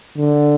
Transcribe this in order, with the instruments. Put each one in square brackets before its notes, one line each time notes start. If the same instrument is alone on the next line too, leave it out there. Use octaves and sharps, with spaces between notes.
[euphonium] D3